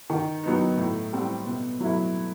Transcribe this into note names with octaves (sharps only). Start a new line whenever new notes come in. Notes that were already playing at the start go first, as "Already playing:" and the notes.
D#3
F#3 B3 D#4
A2
G3 C4
B2
F#3 A3 E4